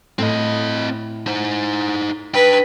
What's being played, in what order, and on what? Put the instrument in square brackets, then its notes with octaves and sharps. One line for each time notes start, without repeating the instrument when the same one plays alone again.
[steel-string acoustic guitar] A2 [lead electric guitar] C4 D#5
[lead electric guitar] D#4 C5
[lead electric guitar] D4 G5 [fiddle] B4